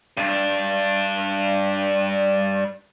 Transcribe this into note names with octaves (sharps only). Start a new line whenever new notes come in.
G2 D4